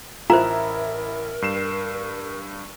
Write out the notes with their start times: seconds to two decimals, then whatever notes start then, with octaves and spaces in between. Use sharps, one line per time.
0.30 A1 E4 F4 A#4 C5 E5 A#5
1.42 G2 C7 E7